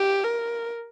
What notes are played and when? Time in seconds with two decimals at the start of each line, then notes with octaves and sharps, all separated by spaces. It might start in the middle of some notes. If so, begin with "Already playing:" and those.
Already playing: G4
0.24 A#4